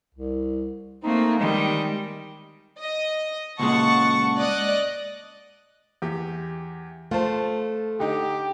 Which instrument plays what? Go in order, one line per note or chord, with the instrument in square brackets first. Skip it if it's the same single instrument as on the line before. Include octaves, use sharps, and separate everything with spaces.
[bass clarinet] C2
[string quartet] A3 A#3 C4 [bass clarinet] D#4
[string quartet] D#3 G3 [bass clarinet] G#3
[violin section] D#5
[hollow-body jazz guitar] C#2 A#2 G#3 [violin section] F#5 A5 C#6
[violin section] D5 D#5 F#6
[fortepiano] E2 G4
[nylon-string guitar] A3 C5 [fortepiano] F4 A5
[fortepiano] D3 D#4 [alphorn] G4